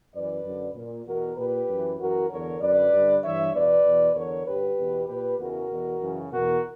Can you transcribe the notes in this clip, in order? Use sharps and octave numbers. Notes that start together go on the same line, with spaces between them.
F#2 E3 B4 D5
F#2 D3
A#2
E2 B2 F#4 A#4
A#2 G4 B4
F#2 E3
F#2 E3 F#4 A#4
E2 D3 A#4 C#5
F#2 D3 B4 D5
G2 D3
G2 E3 C#5 E5
E2 B2 B4 D5
E2 B2
E2 D3 A#4 C#5
G2 D3 G4 B4
E2 B2
A#2 G4 B4
E2 C#3 E3 F#4 A#4
E2 B2
F#2 C#3 E3
E2 B2 F#4 A#4